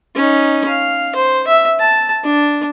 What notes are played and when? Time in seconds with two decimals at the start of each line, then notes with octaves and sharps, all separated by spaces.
0.16 C#4 D#4
0.68 F5
1.15 C5
1.47 E5
1.80 A5
2.24 D4